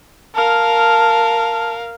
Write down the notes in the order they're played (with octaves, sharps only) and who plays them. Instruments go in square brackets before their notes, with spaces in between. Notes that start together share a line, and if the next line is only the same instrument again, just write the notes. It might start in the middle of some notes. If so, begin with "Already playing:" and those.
[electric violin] A#4 F5 [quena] A5